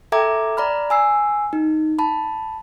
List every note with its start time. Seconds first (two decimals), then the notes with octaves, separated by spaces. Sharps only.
0.12 A4 E5 G5 A#5 D6 G#6
0.57 D5 A#5 B5 F6
0.90 G#5 E6 C7
1.53 D#4
1.99 A5 B5